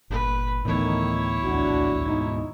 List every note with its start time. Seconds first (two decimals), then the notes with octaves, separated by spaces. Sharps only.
0.10 G1 A#2 B4
0.65 D2 A2 D#3 E3 A3 B3 E4 C#5
1.44 A#1 D#2 A2 D4 F#4
2.06 G#2 B2 D#4